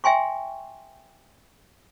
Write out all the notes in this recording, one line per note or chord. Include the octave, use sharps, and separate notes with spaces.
E5 G5 G#5 C6 C#6